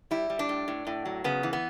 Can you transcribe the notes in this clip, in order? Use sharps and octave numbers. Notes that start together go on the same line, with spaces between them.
G3 E4
G3
D4
A2
A2
A2
F#3
C#3 B3
E3
B3